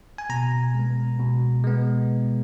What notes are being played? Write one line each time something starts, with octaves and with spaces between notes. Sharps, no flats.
G#5
B2 A#5
G#3 B3
B2
G#3 B3